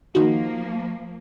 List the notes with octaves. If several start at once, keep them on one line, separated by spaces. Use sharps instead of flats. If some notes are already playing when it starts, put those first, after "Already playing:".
D#3 F3 A#3 D#4 F#4